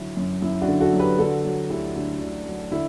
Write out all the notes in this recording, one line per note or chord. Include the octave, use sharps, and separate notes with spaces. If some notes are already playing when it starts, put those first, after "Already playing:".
Already playing: D3 F#3 E4
F#2
F#2 E4
D4 F#4
D3
F#4 A4
F#3
G4 B4
D3 F#4 A4
F#3
D2 E4 G4
D2 D4
D3 D4
F#3
D3 E4